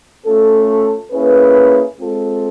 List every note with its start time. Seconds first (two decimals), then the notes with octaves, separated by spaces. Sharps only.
0.25 A3 C#4 F4 A4
1.11 A#3 C#4 E4 G#4 B4
1.98 G#3 C4 F4 A4